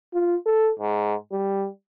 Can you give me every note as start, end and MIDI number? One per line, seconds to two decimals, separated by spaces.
0.14 0.36 65
0.46 0.71 69
0.79 1.14 44
1.32 1.68 55